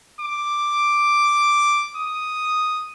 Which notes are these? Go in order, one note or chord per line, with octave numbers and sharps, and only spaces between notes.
D6
D#6